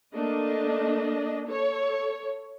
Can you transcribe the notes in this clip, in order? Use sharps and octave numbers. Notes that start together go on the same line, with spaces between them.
A3 A#3 D4 D#5
A4 C#5